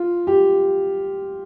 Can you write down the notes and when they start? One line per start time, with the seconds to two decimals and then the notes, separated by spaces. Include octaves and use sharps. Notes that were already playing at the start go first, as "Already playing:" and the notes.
Already playing: F4
0.27 G4